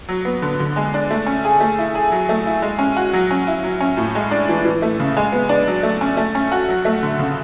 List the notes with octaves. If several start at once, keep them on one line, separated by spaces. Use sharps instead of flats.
F#3
B3
D3
D3
G#3
D4
A3
C#4
G#4
A3
E4
G#4
F#3
A3
E4
G#3
C#4
F#4
F#3
C#4
E4
F#3
C#4
A2
G#3
D4
E3
E3
A3
C#3
G#3
B3
D4
F#3
A3
C#4
A3
C#4
F#4
F#3
A3
D3
C#3